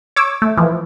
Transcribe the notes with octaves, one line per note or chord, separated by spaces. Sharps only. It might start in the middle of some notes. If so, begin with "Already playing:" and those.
C#5 D6 E6
A3
E3 F3